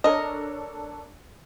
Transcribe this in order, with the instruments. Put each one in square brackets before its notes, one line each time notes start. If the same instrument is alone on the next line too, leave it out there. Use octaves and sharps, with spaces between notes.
[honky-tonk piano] D4 A4 C#5 [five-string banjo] A#4 D#5